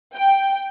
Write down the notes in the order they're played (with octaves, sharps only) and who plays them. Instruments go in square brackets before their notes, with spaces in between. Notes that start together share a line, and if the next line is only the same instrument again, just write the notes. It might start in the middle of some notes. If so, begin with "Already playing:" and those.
[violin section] G5